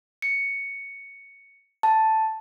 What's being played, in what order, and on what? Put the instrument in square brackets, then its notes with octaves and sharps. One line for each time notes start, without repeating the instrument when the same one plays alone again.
[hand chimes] C#7
A5